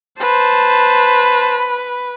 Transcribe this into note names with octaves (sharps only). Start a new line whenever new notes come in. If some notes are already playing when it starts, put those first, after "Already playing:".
B4 C5 A5